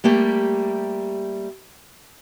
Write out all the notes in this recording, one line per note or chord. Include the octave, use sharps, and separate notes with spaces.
G3 A3 A#3 G4